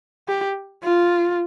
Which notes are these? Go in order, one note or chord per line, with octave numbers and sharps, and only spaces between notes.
G4
F4